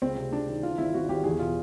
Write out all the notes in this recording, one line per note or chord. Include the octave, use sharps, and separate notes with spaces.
C#2 C4
C3
C#2 D4
D#3
E3 F4
G#1 E4
G#1 F#4
G#1 G4
E2 G#4
B2 F4